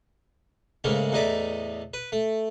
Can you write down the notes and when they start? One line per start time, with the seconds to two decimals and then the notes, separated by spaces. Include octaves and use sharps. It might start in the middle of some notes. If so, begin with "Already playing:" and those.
0.84 G#2 C#3 A3 A#3
1.12 E2 A2 D#4 D5 B5
1.94 B4
2.12 A3